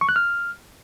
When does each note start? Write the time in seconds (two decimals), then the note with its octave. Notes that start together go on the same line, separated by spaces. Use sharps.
0.01 C#6
0.09 F#6
0.16 F6